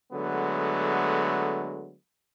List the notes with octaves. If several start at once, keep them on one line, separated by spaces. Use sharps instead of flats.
D3 F#3 G#3 A3 B3